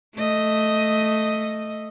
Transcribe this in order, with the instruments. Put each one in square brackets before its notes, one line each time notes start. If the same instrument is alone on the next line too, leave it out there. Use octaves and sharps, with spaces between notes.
[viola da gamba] A3 D#5